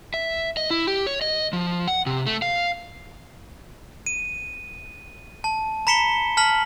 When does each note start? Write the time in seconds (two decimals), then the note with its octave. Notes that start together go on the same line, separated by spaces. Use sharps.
0.14 E5
0.57 D#5
0.71 E4
0.87 G4
1.07 C#5
1.22 D#5
1.53 F3
1.88 F#5
2.06 C3
2.26 A3
2.42 F5
4.06 D#7
5.44 A5
5.87 A#5 B5 B6 C#7 E7 G7
6.37 A5 F6 B6 F#7